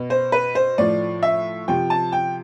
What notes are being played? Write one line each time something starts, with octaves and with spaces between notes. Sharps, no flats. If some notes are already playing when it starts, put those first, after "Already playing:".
Already playing: B2
C5
B4
C5
A2 F3 D5
E5
C3 F3 G5
A5
G5